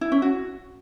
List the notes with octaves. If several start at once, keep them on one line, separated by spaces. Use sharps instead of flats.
E4
C#4
F#4